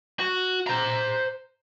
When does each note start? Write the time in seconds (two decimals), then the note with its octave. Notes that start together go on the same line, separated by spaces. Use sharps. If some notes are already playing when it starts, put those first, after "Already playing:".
0.20 F#4
0.67 C5 A#5